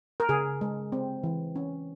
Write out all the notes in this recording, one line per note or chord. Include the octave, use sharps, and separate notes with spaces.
A#4
C#3 G#4
G#3
C4
E3
C#4